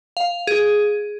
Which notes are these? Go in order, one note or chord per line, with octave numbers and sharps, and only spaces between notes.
F5
G#4